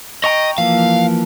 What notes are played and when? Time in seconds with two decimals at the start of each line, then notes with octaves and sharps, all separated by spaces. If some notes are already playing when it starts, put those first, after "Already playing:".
0.24 D#5 G5 A#5 C#6
0.58 E3 F3 A#3 F5